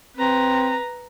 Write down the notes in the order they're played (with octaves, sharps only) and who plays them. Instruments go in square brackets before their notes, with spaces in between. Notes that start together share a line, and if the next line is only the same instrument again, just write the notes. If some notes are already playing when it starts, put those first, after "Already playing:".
[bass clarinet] C4 [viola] B4 A#5